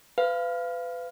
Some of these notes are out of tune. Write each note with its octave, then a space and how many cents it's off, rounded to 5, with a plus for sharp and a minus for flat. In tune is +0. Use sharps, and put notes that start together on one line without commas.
B4 +30 F5 -25